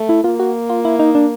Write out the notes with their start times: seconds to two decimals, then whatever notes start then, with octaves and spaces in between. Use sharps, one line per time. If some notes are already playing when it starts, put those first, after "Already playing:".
Already playing: A3
0.09 E4
0.24 A#3 F4
0.40 F#4
0.70 F4
0.85 E4
0.99 D#4
1.15 D4